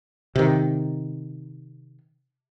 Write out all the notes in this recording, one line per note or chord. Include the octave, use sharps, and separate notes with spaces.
C3 D#3